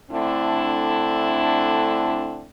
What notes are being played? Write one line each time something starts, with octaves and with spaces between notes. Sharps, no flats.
D3 A3 C4 D4 E4